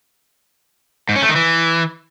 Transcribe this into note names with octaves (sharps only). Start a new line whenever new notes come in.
G#2
C#4
A3
D#3
E3